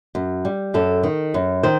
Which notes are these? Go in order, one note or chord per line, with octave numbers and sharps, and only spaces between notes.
F#2
G3
F#2 A4
D#3
F#2
D#3 C5